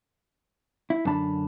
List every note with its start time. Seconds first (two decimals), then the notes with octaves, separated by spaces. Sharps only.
0.90 E4
1.05 F#2 D3 D4 A5 B5